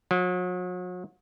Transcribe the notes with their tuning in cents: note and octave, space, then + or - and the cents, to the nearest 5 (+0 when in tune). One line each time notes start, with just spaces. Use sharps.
F#3 -40